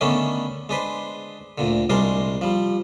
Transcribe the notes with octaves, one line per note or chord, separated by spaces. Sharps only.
D3 D#3 A3 B3 C#4 D4
G#3 D4 B4 C5
D2 A#2 D3
C2 G3 G#3 D4 A#4 C5
F3 G3